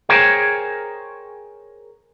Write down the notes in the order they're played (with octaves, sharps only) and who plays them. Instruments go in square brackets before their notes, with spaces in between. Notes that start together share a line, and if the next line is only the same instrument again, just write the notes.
[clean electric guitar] G#4 A#4 C5 C#5 G5 G#5